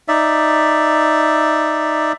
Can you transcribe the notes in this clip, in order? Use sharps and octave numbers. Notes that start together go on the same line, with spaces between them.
D#4 D5 E5